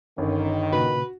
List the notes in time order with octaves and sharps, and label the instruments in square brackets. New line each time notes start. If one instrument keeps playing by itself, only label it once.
[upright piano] G1 [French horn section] D#3 [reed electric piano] C#4
[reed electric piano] A#2 C#3 [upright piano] F#4 [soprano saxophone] B4